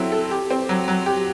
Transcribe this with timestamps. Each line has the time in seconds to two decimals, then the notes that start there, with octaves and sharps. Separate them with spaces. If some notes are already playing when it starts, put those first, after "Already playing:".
Already playing: F#3 C4 E4 A4
0.12 A4
0.31 G4
0.50 C4
0.69 F#3
0.88 F#3
1.06 G4